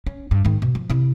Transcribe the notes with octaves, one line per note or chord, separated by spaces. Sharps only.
C#4
G2
G#2 D#3
B2
F3
C3 E4